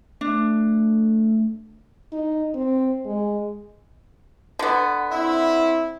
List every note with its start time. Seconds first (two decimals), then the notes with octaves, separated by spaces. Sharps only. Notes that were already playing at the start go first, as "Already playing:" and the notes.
0.21 A3 D4
2.12 D#4
2.54 C4
3.05 G#3
4.59 D3 B3
5.11 C4 E4